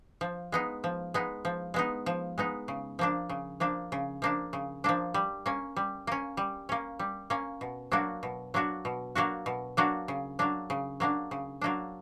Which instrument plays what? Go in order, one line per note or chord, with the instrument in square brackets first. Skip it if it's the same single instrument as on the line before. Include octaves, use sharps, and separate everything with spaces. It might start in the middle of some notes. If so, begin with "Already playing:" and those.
[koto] F3
G#3 B3 D#4
F3
G#3 B3 D#4
F3
G#3 B3 D#4
F3
G#3 B3 D#4
C#3
F3 A#3 D4
C#3
F3 A#3 D4
C#3
F3 A#3 D4
C#3
F3 A#3 D4
G3
A#3 C#4
G3
A#3 C#4
G3
A#3 C#4
G3
A#3 C#4
B2
F#3 A#3 D4 F#4
B2
F#3 A#3 D4 F#4
B2
F#3 A#3 D4 F#4
B2
F#3 A#3 D4 F#4
C#3
F#3 A#3 D4
C#3
F#3 A#3 D4
C#3
F#3 A#3 D4